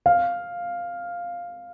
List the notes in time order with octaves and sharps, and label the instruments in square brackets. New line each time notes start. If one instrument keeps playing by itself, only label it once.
[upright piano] F5